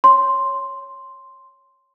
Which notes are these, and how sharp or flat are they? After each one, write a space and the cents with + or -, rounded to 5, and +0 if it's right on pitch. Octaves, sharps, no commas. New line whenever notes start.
C#5 +0 C6 +0